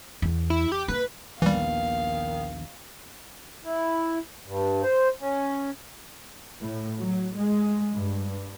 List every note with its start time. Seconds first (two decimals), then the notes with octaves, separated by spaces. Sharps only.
0.22 E2
0.50 E4
0.72 G4
0.88 A#3 B4
1.42 A#1 D#2 D#3 E3 G3 B3 F5
3.65 E4
4.46 G2
4.83 C5
5.20 C#4
6.60 A2
6.98 F#3
7.35 G#3
7.94 G2